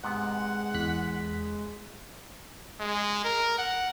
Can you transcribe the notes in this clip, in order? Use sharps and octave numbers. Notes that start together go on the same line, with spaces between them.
G#2 C3 G#3 B3 F#5
E2 F#6 B6
G#3
A#4
F#5